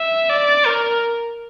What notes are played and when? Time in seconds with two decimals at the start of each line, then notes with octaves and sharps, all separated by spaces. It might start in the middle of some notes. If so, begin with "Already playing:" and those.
Already playing: E5
0.29 D5
0.66 A#4